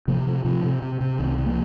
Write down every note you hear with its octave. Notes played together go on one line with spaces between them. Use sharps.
C3 F3 A#3
C3 F3
C3 F3
C3
C3
C3
C2 D#3
C3
F3 A#3